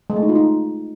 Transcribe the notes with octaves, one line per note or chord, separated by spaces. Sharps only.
G#3
A3
D#4
F4
D#4